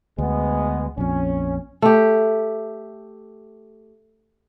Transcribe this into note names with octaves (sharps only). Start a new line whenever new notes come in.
D2 G#3 B3
A#1 F2 C#4
A3 G4